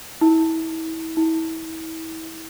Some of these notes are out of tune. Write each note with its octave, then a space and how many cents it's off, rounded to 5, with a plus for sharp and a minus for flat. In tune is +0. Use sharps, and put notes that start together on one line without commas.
E4 -35
E4 -35